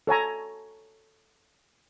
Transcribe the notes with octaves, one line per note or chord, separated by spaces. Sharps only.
A4 C#5 G#5 A#5